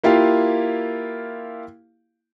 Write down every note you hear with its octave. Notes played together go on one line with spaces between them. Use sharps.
A#3 E4 F4 G4 F5